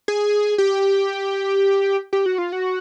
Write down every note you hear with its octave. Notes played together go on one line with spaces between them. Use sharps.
G#4
G4
G4
F#4
F4
F#4